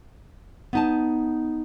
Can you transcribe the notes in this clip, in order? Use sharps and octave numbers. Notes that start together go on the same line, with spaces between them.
B3 D#4 A5